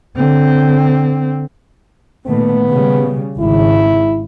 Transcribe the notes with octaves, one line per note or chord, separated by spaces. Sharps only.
D3 C4
A#2 D#3 A3 B3
C#3 G3
G#1 C#3 E4